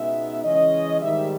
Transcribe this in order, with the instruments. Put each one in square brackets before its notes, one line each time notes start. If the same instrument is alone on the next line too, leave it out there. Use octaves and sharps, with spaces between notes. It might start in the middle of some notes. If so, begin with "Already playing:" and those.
Already playing: [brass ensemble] C#2 B2 G#3 B3 D#4 E5
C#3 E3 G#3 C#4 D#5
G#2 D#3 G3 E5